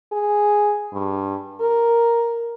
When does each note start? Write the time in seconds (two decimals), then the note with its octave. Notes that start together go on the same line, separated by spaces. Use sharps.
0.12 G#4
0.93 G2
1.61 A#4